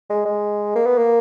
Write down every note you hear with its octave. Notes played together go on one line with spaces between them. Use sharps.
G#3
G#3
A#3
B3
A#3